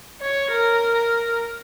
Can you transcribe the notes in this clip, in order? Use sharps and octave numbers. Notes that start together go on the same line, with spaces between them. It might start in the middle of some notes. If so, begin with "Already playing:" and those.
C#5
A#4